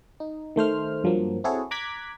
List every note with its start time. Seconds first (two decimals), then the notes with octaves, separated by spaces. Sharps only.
0.20 D#4
0.56 D#3 A3 C5 F6
1.04 G2 F3 F#3 A#3
1.44 C4 E4 F#4 G#4 A4 C#5
1.71 A#5 D6 F#6 G#6 B6